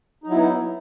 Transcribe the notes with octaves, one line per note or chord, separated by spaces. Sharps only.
F#3 B3 D#4 E4